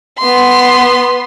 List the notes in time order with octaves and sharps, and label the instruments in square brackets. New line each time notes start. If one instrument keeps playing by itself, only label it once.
[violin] B3 C6